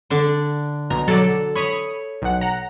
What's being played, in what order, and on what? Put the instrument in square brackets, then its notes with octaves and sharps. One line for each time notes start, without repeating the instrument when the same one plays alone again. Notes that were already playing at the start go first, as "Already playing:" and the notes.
[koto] D3 D4
[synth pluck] B1 [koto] A#5
[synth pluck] F#3 D5 [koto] A4
[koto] C#5 [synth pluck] B5 D#6
[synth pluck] B1 F#5
F#5 A#5